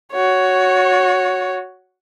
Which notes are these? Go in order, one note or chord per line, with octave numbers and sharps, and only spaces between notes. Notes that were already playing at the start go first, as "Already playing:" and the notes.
F#4 C#5